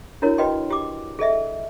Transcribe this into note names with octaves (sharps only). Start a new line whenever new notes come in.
D4 E4 F#4 A#4 C#5
F#4 B4 D#5 G5 C6
G4 D6
G#4 A4 D#5 E5